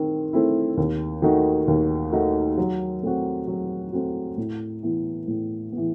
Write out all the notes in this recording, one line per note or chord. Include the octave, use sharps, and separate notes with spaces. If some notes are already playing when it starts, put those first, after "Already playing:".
Already playing: D#3 A3 C4
A3 C4 E4
D#2
D#3 A3 D#4 F#4
D#2
D#3 A3 D#4 F#4
F#3
A3 C4 F#4
F#3
A3 C4 F#4
A2
E3 B3
A2
B3
E3